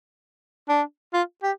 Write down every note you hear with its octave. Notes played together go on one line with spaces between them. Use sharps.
D4
F4
G4